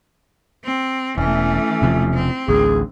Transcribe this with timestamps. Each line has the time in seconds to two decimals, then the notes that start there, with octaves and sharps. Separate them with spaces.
0.64 C4
1.18 E1 E3 A3 C#4
1.82 E1 C3 F3
2.14 C4
2.48 A1 D2 G#4